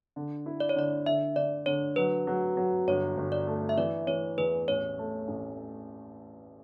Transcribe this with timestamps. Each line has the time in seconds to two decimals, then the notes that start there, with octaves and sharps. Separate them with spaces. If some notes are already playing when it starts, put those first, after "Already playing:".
0.16 D3
0.46 E4
0.60 D5
0.69 C#5
0.75 D3 D5
1.06 D3 E5
1.36 D3 D5
1.66 D3 C#5
1.96 F#3 B4
2.27 F#3
2.57 F#3
2.88 G1 C#5
3.17 G1
3.32 D5
3.47 A3
3.69 E5
3.78 E3 D5
4.07 E3 C#5
4.38 E2 B4
4.68 A1 C#5
4.98 A3
5.28 A1